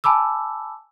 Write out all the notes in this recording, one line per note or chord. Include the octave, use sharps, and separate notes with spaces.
G#5 A5 B5 D6 E6